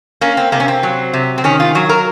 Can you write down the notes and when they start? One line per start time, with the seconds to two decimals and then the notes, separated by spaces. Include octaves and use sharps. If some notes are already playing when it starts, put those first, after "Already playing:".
0.21 A#3 C#4
0.37 C4
0.52 C3 A#3
0.60 C#4
0.68 C4
0.83 F#3
1.14 C3
1.38 C4
1.44 D#3 C#4
1.60 F4
1.75 F#3 F#4
1.89 A#4